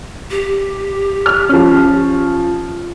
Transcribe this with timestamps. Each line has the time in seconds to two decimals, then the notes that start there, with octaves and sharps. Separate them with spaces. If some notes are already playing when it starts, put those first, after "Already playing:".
0.31 G4
1.26 F6
1.49 F3 C#4